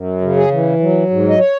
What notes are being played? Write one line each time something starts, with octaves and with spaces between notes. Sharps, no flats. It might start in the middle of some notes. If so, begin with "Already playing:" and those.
Already playing: F#2
C#3
G#4
E3
F#3
G#2
D#5
C#5